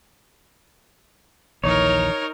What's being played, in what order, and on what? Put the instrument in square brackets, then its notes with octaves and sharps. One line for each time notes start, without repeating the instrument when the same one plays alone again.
[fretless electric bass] A#1 D#2 E3 [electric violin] D#4 A#4 [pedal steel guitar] C#5